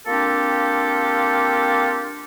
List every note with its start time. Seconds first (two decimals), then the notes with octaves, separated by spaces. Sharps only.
0.07 A#3 C4 D4 F4 G4 A4